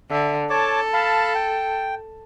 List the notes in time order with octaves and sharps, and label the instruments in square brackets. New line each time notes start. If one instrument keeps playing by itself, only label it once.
[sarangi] D3 [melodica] E5
[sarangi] A4 [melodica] C#5 A5 D6
[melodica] F5 A5 B5
G5